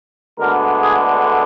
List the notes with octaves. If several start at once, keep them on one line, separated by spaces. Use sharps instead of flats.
D2 D3 G#3 B3 A#4
G#4